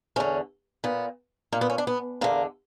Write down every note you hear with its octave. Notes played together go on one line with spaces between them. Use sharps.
E2 D3 C#4
A#2 B3
A#2 A#3
B3
C#4
D4
B3
E2 D3 A#3